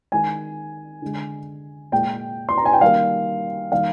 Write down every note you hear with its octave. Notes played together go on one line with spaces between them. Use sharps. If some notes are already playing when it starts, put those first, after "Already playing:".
D#3 G#3 G#5
D3 G#3
A#2 G#3 G5
C6
A#5
G#5
G5
D#3 G3 A#3 F5
D#3 G3 A#3 F5